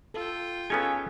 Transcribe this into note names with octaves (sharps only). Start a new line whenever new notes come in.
F4 A4 G5
B3 C#4 D#4 G#4 A4 C#5 F5 G#5